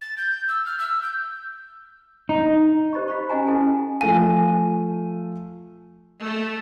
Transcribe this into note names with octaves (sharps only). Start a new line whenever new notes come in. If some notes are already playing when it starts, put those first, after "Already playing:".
A6
G6
E6
F6
E6
G6
D#4
G4 C5 D#5 B5 C#6
F5 B5 C#6
C#4 F#4 D#5 F#5 G#5 A#5
C#4 E4 A4 G#5 A5
F3 A3 F5 G#5
A3